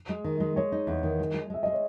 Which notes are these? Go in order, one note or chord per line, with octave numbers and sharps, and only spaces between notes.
G#3
D#3
G#3
G#3 C#5
D#4
E2
D#3
G#3
G#3
G#3 E5
G#3 D#5
C#5